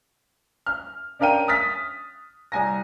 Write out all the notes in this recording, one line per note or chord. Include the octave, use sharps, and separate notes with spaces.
F6
C#4 D4 A#4 F5 G5 D#7
D#6 F6 A6 B6
C2 G#5 A#6